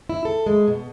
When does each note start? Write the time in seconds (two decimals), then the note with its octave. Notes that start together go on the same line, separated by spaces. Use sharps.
0.09 E4
0.25 A4
0.46 G#3
0.68 B2